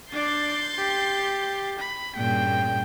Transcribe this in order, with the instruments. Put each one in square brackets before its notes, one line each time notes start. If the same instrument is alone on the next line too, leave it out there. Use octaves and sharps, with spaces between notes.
[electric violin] D4 D5 [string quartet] C6 G6 A6
[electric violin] G4
B5
[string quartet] G2 A#2 C#3 [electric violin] G5